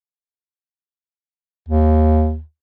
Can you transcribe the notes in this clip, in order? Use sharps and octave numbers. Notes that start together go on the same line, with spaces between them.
D#2